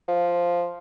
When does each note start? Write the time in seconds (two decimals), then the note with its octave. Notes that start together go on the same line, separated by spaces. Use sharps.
0.08 F3